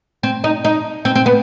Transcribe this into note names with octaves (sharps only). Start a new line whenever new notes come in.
C4
D#4
D#4
C4
C4
B3